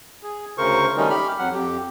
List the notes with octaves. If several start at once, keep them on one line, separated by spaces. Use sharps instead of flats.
G#4
D2 C#3 A#4 C5 C#6
D#3 G3 A3 C#4 D#4
G4 B5 F6
F2 F#3 F#5
F2 G4